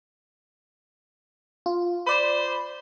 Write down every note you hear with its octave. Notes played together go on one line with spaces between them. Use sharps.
F4
C5 D5 B5